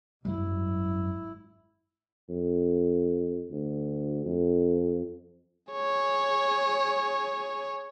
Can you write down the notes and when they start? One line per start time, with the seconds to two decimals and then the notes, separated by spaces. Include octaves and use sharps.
0.25 G#1 F#2 F#3 G3 E4
2.29 F2
3.51 D2
4.25 F2
5.73 G#4 C#5